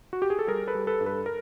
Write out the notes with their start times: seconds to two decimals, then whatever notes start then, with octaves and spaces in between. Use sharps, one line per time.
0.13 F#4
0.22 G4
0.30 G#4
0.39 A4
0.47 G3 G#4 A#4
0.67 A4 B4
0.75 G3
0.87 A4 B4
1.01 G2
1.06 A4 B4
1.26 A#4